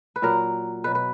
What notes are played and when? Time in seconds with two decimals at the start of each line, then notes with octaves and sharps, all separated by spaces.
0.16 B4
0.22 A#2 F#3 A#4
0.84 B2 F#3 B4
0.95 B4